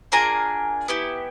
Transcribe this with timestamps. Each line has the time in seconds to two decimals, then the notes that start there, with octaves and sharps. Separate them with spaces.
0.12 A#3 D4 F4 G#4 G#5 A#5
0.88 B3 E4 G4